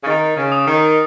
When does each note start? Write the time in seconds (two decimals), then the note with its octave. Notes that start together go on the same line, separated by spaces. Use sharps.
0.03 C#3
0.06 D#3 A6
0.36 C#3
0.52 D#6
0.66 D#3